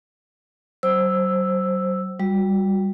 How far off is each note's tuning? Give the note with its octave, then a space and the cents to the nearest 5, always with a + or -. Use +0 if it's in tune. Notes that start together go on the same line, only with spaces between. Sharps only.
F#3 +40 C5 +5 E6 +0
G3 +0 F#4 -20